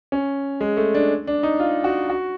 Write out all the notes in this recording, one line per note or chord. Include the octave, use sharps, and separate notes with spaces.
C#4
G#3
A3
D4
D4
D#4
F4
F#4
F#4